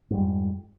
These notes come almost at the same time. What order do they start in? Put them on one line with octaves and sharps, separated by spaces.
G#2 G3 F2